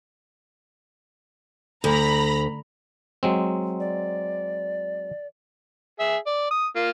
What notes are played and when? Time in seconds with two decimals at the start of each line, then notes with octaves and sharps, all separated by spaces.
1.84 D2 A#5 B5 A#6
3.23 F#3 G#3 C4
3.80 D5
6.00 G#4 E5
6.27 D5
6.51 D#6
6.76 A#3 F4